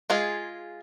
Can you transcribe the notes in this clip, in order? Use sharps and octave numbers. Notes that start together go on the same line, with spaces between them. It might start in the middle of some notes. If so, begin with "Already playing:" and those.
G#3 F4 G#4